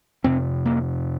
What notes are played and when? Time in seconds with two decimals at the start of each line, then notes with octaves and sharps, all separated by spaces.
0.24 F2 C3 C4
0.66 A#3